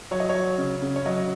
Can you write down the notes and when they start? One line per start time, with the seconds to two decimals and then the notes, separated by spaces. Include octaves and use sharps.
0.11 F#3 C#5
0.20 D#5
0.29 C#5
0.35 F#3
0.58 C#3
0.82 C#3
0.96 C#5
1.06 F#3 D#5